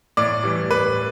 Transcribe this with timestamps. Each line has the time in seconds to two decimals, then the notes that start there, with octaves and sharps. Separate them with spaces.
0.17 A2 D5
0.44 E3 G3
0.70 A2 B4